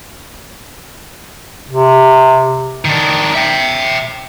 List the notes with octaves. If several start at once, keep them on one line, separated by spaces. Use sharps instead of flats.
C3
D#3 D4
E5 G5